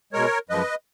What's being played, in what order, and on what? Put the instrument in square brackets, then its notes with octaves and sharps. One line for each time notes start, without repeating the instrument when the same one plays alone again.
[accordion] B2 G#3 A#4 C#5
F#2 F3 G#3 B4 D#5